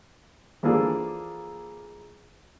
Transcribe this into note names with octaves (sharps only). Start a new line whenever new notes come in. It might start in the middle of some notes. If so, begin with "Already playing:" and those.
E3 F3 A#3 D4 G#4 A4